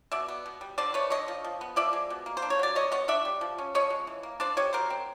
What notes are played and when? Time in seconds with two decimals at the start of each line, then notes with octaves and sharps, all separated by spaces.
0.12 B2 D5 E5
0.28 B3
0.46 B2
0.61 G3
0.78 D3 C5 D5
0.94 A3 B4 C#5
1.10 D3 C#5 D#5
1.28 F3
1.44 F3
1.61 B3
1.76 F3 D5 E5
1.93 G#3
2.10 B2
2.26 A#3
2.37 C5
2.42 D4
2.50 C#5
2.59 F#3 D5
2.75 D3 C#5 D#5
2.92 B3 C#5 D#5
3.08 D4 D5 E5
3.25 G3
3.41 F3
3.58 C#4
3.75 F3 C#5 D#5
3.90 G#3
4.07 E3
4.23 A#3
4.40 D4 C5 D5
4.57 G3 C#5 D#5
4.73 F#3 A#4 C5
4.90 C4